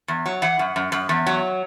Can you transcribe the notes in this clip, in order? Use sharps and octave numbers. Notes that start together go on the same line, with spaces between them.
E2
F#3
E3 F#5
F#2
F#2
F#2
E2
F#3